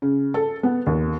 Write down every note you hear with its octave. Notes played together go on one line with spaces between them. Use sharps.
C#3
A4
B3
D#2